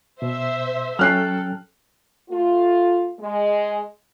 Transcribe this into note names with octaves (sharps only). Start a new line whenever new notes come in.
B2 C5 E5
F#3 C#4 A4 G5 F6 F#6 C7
A3 F4
G#3